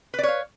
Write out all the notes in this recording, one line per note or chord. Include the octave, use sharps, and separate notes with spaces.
B4 C#5 D5 F5